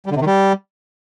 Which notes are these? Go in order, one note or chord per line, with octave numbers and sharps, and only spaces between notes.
G3
D3
C3
D#3
G3